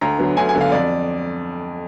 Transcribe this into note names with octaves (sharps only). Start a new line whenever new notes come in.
D2 A#5
D3 F#3 B3
D2 G#5
G#5
D3 F#3 B3
F5
F2 D5